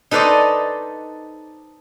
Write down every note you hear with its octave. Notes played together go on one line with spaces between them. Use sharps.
D#4 A4 B4 C5 D5 D#5